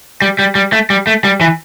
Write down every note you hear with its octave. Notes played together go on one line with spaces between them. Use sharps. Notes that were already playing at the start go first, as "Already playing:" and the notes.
G3
G3
G3
A3
G3
A3
G3
E3